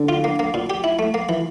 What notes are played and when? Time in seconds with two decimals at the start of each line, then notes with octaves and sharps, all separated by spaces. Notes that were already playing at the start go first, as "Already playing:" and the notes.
Already playing: D3
0.09 F4
0.24 A#3
0.39 A#3
0.54 A#2
0.70 G4
0.84 E4
0.99 A3
1.14 A#3
1.29 E3